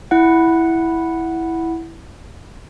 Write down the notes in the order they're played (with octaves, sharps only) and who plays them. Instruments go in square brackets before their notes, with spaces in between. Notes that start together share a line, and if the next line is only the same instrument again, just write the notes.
[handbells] E4 F#5